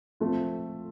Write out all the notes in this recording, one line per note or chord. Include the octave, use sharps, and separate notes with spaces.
F3 A3 C4 F4